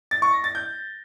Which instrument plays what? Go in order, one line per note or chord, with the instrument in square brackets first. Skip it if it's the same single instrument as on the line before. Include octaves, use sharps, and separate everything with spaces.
[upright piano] A6
C#6
A#6
A6
G6